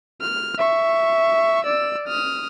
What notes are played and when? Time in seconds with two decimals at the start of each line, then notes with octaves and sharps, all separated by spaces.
0.21 F6
0.58 E5 C#6
1.64 D5 E6
2.07 D#6 F6